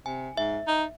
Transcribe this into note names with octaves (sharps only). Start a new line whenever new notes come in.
C3 G#5
G#2 E5
D#4